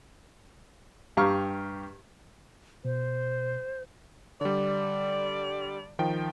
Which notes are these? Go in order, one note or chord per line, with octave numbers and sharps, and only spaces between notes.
G2 G4 F5 A#5 C#6 F6
B2 C5
D3 G3 D5
D#3 F3 G5